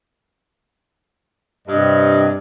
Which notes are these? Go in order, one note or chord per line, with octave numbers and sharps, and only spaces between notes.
G2 C3 D#5